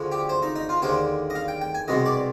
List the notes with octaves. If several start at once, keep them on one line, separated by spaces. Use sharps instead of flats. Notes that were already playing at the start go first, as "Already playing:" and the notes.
Already playing: D2 D3 F3 G#3
G4
C5
D#4
D#4
F4
D#2 D3 G#3 C5
D#5
F5
G5
G5
G#5
C2 B2 G#3 D#5
D5